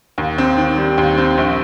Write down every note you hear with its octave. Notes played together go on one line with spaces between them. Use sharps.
D#2
C4
D#3
G3
D#2
C4
A#1